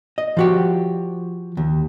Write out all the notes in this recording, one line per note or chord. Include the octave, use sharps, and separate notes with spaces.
D#5
F3 F#4 G4
D#2